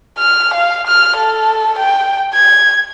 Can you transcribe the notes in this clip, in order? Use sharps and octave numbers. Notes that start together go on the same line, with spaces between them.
F6
F5
F6
A4
G5
G#6